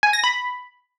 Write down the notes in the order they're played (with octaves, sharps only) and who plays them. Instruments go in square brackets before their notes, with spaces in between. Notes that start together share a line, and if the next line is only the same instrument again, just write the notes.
[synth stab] G#5
A#6
B5